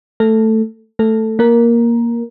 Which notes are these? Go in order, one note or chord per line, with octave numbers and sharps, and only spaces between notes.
A3 A4
A3 A4
A#3 A#4